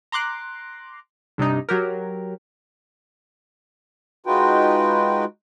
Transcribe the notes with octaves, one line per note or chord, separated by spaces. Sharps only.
A#5 C6 D6 F#6
G2 C3 D4 D#4
F#3 G4 A#4
G#3 D#4 F4 F#4 B4 G5